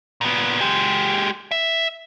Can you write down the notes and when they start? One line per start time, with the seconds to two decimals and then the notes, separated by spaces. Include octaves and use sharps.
0.21 A#2 B3
0.61 G#3 G4
1.51 E5